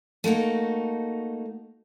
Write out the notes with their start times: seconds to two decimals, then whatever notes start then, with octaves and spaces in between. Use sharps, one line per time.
0.24 A3 A#3 D#4 F#4